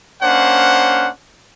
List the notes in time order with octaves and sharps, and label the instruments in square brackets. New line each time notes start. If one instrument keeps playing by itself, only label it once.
[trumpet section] A#3 C#4 D4 C5 F#5